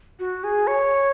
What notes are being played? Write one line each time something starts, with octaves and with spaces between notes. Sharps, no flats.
F#4
G#4
C#5